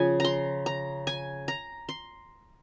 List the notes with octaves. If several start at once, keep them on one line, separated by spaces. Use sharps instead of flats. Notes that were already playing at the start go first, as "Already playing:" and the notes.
Already playing: C#3 F3 G#5
A#5 C6
A#5
G#5
A#5
C6